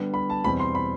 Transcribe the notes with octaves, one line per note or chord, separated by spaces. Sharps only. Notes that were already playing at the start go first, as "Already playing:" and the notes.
Already playing: D3 G3 B3
B5
A5
E2 B2 G3 C4 B5
C6
B5